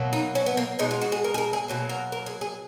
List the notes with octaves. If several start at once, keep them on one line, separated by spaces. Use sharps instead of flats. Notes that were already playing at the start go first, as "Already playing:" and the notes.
Already playing: B2 F#3 A#3
D#4
C#4
B3
A#3
B2 G#3 D#4
F4
F#4
G#4
A#4
G#4
A#4
G#4
B2 F#3 A#3
A#4
A#4
G#4
G#4